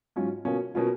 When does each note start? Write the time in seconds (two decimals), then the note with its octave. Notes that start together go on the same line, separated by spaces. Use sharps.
0.16 G#2 F#3 C#4 F4
0.45 B2 A#3 C#4 F4
0.75 B2 A#3 C#4 F4